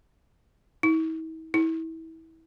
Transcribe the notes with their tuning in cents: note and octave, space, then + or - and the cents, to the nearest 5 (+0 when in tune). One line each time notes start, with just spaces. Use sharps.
E4 -45
E4 -25